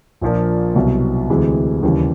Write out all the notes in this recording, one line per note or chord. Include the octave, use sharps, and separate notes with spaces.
A#1 A#2 F3 A#3 D4
C2 B2 F#3
D2 C3 E3 G#3
D#2 C#3 E3 G3